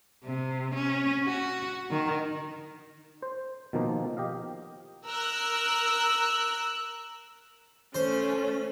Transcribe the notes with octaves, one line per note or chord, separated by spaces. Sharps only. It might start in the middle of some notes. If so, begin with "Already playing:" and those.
C3
C#4
F#4
D#3
C5
B2 D#3 F3 A#3 D#4
G4 D#5 F5
A#4 E6 F#6
A3 C#4 C5